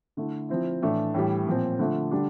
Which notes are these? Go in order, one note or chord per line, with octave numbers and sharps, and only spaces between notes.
D3 A3 E4
F3 C4 E4
A2 E3 A3 D4
A2 E3 G3
A#2 F3 C4
D3 F3 A3
D3 G3 D4